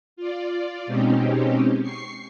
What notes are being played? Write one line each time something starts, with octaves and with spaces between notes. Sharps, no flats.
F4 D5
B2 G#3 C4 C#4 D#4 G4
C#6 C7